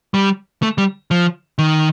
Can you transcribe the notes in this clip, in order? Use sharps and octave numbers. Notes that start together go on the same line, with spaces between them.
G3
A3
G3
F3
D#3